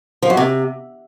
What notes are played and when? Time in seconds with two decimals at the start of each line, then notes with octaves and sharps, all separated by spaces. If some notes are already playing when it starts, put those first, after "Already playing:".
0.22 F3
0.30 F#2
0.37 C3